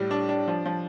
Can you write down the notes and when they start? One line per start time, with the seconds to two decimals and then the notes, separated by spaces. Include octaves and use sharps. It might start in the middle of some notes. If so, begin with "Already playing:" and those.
Already playing: A2 G3
0.11 D4
0.29 D4
0.48 F3
0.66 F3